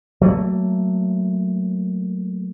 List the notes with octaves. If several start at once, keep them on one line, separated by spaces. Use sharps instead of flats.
F#3 A3 A#3